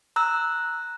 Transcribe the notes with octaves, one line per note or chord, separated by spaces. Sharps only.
A#5 E6 F#6